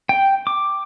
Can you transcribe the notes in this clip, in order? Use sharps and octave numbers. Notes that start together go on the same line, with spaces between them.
G5
D6